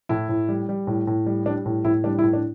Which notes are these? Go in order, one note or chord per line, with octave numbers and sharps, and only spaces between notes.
A2 E4
A2
G3
G3
A2
A2
G3
G3 D4
A2
A2 E4
G3 D4
E4
A2
D4